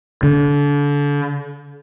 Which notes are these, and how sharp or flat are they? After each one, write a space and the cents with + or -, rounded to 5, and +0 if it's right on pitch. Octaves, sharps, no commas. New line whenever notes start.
D3 -30